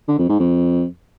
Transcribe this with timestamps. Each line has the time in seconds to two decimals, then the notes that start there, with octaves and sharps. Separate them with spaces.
0.08 D3
0.19 F2
0.29 G#2
0.40 F2